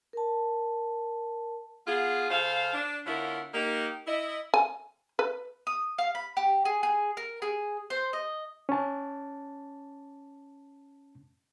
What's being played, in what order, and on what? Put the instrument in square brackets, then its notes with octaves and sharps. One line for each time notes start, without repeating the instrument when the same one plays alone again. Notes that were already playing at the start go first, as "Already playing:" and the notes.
[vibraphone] A#4 A5
[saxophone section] B3 F4 G#4
C#3 A4 C5 F5
D4
D3 B3 C#4 E4 F4 A#4
A#3 D#4 G4
E4 D#5
[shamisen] G#5
B4
[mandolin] D#6
F5
B5
G4
G#4
G#4
A#4
G#4
C5
D#5
[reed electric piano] C#4 A5